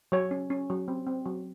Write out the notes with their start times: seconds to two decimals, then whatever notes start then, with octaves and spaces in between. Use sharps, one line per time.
0.12 F#3 C#5
0.31 C#4
0.50 C#4
0.70 F#3
0.88 C4
1.07 C4
1.26 F#3